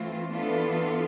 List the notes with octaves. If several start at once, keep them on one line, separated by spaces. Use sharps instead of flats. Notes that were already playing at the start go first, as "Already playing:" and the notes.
Already playing: E3 A3 C4 F4
E3 B3 D4 F4 A4